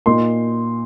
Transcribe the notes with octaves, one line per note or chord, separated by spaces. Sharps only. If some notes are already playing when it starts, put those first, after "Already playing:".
A#2 A#3 D#4 C6